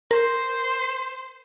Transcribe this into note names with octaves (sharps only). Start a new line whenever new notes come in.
A#4 C5